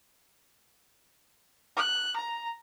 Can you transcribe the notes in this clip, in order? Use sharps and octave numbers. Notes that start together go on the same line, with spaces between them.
F#6
A#5